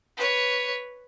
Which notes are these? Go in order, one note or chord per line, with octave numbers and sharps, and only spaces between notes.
B4 C#5